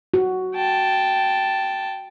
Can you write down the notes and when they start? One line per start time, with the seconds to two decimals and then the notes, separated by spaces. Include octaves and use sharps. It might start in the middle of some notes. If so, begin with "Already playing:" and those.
0.14 F#4
0.55 G5 A5